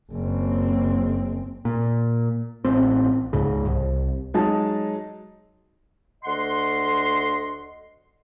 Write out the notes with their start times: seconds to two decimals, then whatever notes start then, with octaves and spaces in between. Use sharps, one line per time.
0.12 F#1 C4
1.65 A#2
2.65 A1 C4
3.33 C#2 G#2 C#3
3.65 C2
4.34 F#3 G#3 D#4 A5
6.24 D2 D#5 F#5 C6